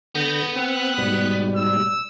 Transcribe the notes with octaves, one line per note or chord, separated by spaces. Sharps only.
D3 B3 G6 A#6
C4 F#6
G#2 B2 G3
E6